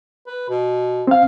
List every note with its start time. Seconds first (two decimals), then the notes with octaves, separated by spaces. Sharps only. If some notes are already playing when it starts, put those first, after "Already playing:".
0.27 B4
0.49 B2
1.07 C4 F5